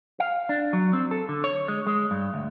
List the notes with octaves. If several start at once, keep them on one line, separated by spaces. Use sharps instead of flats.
F5
D4
F#3
C4
A4
D3
C#5
G#3
G#3
G2
D2